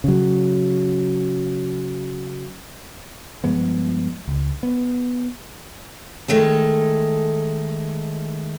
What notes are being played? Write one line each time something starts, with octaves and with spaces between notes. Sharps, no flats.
C#3 F#3
G2 F3 G#3 B3
C#2
B3
D#3 G#3 A3 A4